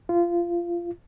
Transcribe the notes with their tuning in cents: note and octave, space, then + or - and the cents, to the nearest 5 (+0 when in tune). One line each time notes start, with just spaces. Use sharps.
F4 -20